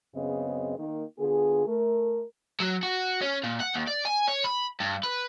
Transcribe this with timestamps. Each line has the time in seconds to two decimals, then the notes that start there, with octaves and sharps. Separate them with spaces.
0.15 F#2 C#3 B3 C4 G#4 D#5
0.78 D#3 A#3
1.18 D3 B3 F4 G#4
1.66 A3 A#4
2.60 F#3
2.83 F#4
3.21 C#4
3.44 A#2
3.60 F#5
3.75 D#2
3.88 D5
4.06 G#5
4.28 C#5
4.45 B5
4.80 G2
5.04 B4